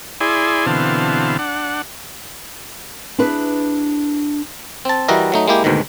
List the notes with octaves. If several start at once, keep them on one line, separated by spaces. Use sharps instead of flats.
E4 G#4 D5 G#5 C6
B2 D3 E3 C4 F5 A5
D4 F#5
D4 E4 G#4 B4
C4 A5
E3 G3 F#4 A#4 D#5 E5
F#3 A3 D#4
G#3 A#3 E4 G4
D2 G#2 B2 D#3